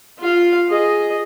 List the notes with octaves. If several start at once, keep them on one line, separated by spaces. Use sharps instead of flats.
F4 F5
G#4 D#5